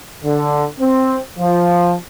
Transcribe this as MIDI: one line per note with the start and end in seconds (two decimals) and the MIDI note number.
0.23 0.65 50
0.80 1.18 60
1.38 1.94 53